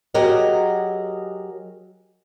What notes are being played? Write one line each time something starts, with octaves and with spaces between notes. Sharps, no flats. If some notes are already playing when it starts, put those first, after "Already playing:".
F#3 G4 G#4 A#4 D#5